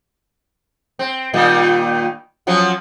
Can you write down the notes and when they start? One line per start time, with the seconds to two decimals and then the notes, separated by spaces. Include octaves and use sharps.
0.99 C4
1.34 A#2 D#3 G3
2.47 F3 F#3 C#4